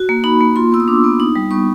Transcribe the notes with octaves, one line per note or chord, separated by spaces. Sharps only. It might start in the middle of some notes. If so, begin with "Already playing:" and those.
Already playing: F#4
A#3
D#4 B5
A#3
F4 C6
B3 E6
D#6
D4 D6
B3
D#4 D#6
G3
B3 C#6